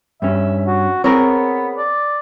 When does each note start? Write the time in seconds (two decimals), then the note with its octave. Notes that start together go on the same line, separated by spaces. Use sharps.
0.22 G2 C#4 E5
0.67 F#4
1.04 B3 C4 G#4 A#4 C#5
1.77 D5